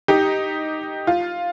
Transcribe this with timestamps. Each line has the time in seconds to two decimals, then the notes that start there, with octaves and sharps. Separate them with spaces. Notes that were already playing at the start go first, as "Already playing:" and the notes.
0.08 D#4 G4
1.07 F4